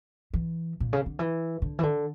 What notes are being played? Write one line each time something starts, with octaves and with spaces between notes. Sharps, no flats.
E3
A#2
C#3
D3
E3
D3
E3
D3